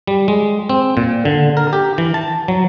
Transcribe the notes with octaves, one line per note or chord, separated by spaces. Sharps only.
G3
G#3
C4
A#2
D3
A#4
G4
E3
A5
F#3